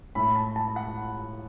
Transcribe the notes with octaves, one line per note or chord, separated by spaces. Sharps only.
A2 A3 B5
A5
A5
F#5